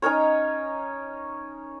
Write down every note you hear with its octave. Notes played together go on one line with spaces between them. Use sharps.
C#4 D#4 A#4 C#5